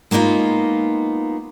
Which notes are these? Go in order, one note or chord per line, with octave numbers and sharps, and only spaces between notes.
G#3 A#3 B3 D#4 F4